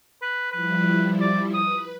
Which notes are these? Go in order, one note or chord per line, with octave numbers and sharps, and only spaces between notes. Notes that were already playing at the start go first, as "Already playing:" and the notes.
B4
F3 G3 E4 B4
D5
B4 D#6